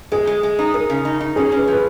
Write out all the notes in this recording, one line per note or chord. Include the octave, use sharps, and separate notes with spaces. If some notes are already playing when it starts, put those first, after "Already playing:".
G#3 G#4
G#3
G#3
D#4
D#4 A#4
C#3
D#4
D#4
C#4 G#4
C#4
B4
F3 B4